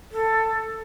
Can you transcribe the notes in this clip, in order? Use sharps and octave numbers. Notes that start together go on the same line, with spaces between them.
A4